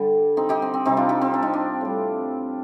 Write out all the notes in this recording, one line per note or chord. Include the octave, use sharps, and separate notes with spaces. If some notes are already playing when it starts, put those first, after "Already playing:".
Already playing: D3 G3
C4 D#4
D#4 G4
C4
C4
C3 G3 C4 D#4
D4 F4
D#4 G4
C4
D4
D#4
D4
A2 G3